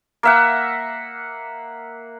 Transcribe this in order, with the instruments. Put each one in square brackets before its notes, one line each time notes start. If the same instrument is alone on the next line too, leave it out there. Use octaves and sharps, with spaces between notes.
[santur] A#3 E5 F#5